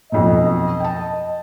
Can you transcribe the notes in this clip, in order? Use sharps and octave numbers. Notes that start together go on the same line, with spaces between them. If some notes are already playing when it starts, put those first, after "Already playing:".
B1 F2 B2 D#5
G5 A5